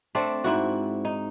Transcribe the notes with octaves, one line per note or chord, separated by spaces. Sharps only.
A3 C4 D4 A4
G#2 E4 F#4
D#4